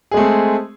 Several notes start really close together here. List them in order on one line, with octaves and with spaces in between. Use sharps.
G#4 G#3 A3 C4